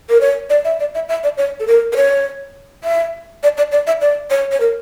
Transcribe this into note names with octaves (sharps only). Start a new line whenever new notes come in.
A#4
C#5
D5
E5
D5
E5
E5
D5
C#5
A4
A#4
A#4
C#5
E5
D5
D5
D5
E5
D5
C#5
C#5
A#4